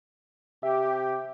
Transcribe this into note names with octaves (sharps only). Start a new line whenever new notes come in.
C3 G4 E5